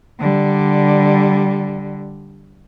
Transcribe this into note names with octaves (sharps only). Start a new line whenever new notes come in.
D3 G3